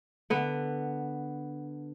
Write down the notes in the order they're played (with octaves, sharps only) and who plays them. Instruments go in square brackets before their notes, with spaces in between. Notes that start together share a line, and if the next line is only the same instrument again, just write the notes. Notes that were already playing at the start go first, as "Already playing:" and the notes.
[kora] D3 B3